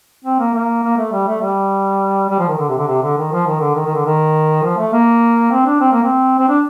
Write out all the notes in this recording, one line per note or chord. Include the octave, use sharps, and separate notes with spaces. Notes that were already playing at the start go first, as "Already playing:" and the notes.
C4
A#3
A#3
A#3
A3
G3
A3
G3
G3
F3
D#3
D3
C3
D3
C3
D3
D#3
F3
D#3
D3
D#3
D#3
D3
D#3
F3
A3
A#3
C4
D4
C4
A#3
C4
C4
D4